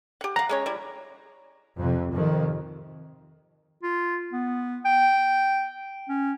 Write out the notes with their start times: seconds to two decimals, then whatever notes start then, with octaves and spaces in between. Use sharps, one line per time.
0.21 G4 F#5
0.36 F5 F#5 A#5
0.49 G#3 C#4 C#5
0.66 G3 E4
1.79 F2 C3
2.12 F2 C3 D#3
3.83 F4
4.33 B3
4.85 G5
6.09 C#4